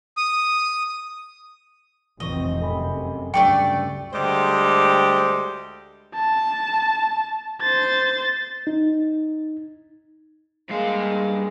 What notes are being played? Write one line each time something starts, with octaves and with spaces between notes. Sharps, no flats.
D#6
F1 B1 A2 E3 C4 D#5 C#6
F#2 C3 A4 G#5 B5
D2 G2 C#3 F#3 A3 D5 G5 C#6
D2 G3 G#3 G4 C5
A5
C5 A6
D#4
G2 G#3 A#3 F5